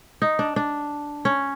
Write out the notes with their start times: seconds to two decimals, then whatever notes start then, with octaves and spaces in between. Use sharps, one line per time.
0.22 D#4
0.39 D4
0.56 D4
1.25 C#4